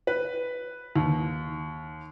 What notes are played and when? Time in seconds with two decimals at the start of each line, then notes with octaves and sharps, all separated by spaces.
0.07 B4
0.96 D#2